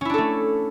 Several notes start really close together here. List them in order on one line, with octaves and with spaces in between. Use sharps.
C#4 E4 D4 A4 A3